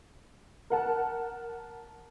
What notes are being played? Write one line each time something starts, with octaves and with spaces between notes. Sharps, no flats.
A#4 F#5 A5